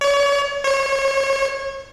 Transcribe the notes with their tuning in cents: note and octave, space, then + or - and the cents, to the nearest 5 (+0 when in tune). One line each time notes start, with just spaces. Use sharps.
C#5 +35
C#5 -30